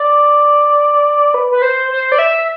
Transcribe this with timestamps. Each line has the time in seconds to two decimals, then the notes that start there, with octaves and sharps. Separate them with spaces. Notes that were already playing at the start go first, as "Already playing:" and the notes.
Already playing: D5
1.34 B4
1.51 B4
1.62 C5
1.90 C5
2.12 D5
2.19 E5